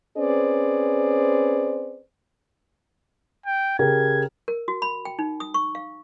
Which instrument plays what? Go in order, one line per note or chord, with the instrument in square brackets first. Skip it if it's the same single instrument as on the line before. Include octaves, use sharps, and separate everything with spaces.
[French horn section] C4 C#4 G#4 B4 C5 D5
[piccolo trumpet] G5
[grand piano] C#3 G4 A#4 [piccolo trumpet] G#6
[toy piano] A#4
F#4
B5
G5
D#4
D#6
C#6
F5